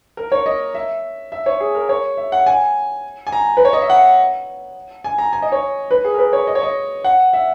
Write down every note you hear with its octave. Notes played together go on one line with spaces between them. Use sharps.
A#4
C#5
D#5
E5
E5
C#5
G#4
A#4
C#5
E5
F#5
G#5
G#5
A#5
B4
C#5
D#5
E5
F#5
G#5
A#5
G#5
D#5
C#5
B4
G#4
A#4
B4
C#5
D#5
C#5
D#5
F#5
E5